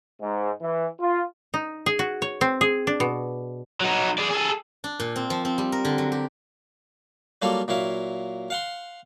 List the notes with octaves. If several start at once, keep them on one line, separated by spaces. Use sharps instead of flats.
G#2
E3
F4
D#4
G#4
F#4
C#5
C4
G#4
D4
B2
F#3 D#4
G#4 D5
G#4 A4
D4
A#2
C4
F3
C4
G3
A#4
D3
F#3
G4
F#3 G3 A#3 F4 A4 F5
A#2 F#3 E4 F5
F5 F#5 C6